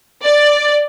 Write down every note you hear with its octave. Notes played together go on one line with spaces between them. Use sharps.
D5